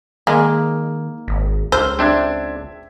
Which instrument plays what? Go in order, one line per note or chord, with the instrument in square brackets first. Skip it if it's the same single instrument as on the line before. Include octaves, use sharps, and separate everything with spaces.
[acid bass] D#3 [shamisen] G#3 [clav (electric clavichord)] A#3
[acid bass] G#1
[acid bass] C#2 [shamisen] C5 [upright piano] E6 F6
[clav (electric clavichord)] C4 D4 [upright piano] E5 G#6